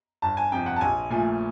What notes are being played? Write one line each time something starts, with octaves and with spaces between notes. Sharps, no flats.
G1 A5
G#5
F2 C3 G5
F#5
A5
A#1 G#5
A#2 F3 A3 G#5